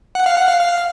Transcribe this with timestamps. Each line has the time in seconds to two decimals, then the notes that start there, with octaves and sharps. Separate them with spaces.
0.15 F#5
0.26 F5
0.37 F#5
0.48 F5
0.60 F5